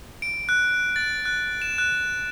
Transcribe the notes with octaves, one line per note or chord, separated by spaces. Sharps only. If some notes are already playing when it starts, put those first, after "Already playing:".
D7
F#6
A6
F#6
E7
F#6